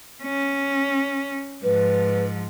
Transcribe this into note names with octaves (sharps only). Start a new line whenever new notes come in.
C#4
G#2 F3 B4